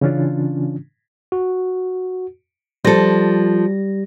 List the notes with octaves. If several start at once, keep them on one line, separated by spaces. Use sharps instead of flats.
C#3 E3 C#4 D4 F4
F#4
F3 G3 A4 A#6